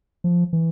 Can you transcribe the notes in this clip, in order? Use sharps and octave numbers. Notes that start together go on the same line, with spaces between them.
F3
E3